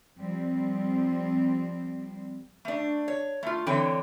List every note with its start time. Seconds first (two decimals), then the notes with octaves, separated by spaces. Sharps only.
0.17 F3 G3 C4
2.65 A3 D4
3.08 C#5
3.43 A3 F4
3.66 D3 E3 C4 C#5 G5